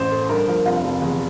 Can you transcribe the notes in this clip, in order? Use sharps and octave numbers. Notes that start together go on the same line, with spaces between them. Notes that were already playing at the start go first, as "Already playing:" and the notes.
Already playing: A1 C5
A3
G2 A#4
F3 A#4
F1 F4
F1
E2